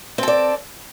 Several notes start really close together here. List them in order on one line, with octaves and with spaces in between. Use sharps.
C4 A4 D5